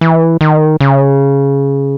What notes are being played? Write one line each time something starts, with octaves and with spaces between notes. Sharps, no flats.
E3
D#3
C#3